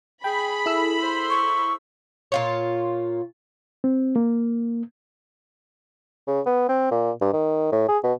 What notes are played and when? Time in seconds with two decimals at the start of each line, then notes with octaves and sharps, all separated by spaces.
0.24 G#4 G5 B5
0.66 E4 A4 E6
0.99 C5 C6
1.30 C#6
2.32 A#2 F4 C#5
3.84 C4
4.16 A#3
6.27 C#3
6.46 B3
6.69 C4
6.91 A#2
7.21 G2
7.33 D#3
7.72 A2
7.89 G#4
8.04 B2